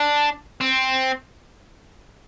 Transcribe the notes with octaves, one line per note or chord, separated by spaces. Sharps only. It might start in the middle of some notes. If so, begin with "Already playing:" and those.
Already playing: D4
C4